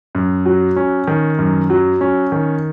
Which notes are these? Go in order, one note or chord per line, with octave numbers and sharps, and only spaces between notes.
F#2
F#3
C#4
D#3
F#2
F#3
C#4
D#3